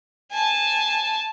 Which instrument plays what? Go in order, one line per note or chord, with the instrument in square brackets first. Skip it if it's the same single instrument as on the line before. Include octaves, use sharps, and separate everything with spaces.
[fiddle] G#5 A5